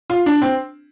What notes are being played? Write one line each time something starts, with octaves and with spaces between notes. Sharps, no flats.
F4
D4
C4